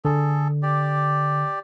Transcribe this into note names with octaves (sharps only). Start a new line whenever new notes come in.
D3 G#4 A4
G4 D5